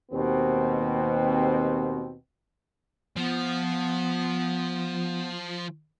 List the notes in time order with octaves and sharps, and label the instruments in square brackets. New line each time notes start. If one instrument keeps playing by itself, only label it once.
[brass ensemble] D#2 B2 C4
[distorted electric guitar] F3 [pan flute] B3